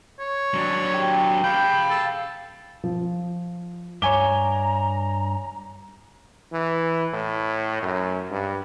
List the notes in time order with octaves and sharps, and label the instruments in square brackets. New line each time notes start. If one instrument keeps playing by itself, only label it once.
[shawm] C#5
[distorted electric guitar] F#3 D4
[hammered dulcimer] G4
[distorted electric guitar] F5 B5 [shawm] G5
[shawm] A4
[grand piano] F3
[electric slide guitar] G2 E5 [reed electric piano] C#5 G#5 D6 [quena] A#5 [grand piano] G7
[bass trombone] E3
A2
F#2
G2